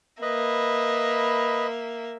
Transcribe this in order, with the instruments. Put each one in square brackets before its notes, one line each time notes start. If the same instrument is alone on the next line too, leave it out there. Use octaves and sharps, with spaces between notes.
[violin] A#3 E5 [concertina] B4 D#5 B5